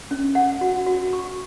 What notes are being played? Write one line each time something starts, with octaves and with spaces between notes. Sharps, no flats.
C#4
F#5
F#4
F#4
C#6